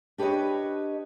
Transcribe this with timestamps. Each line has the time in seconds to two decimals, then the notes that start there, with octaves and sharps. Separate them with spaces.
0.18 D4 G4 B4 C#5 D#5